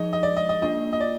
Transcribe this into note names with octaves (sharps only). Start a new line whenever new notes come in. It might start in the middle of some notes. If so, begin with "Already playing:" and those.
Already playing: F3 G#3 D#4 G#4 D#5
D#5
D5
D#5
D#5
A#3 D4 F4 D#5
D#5
D5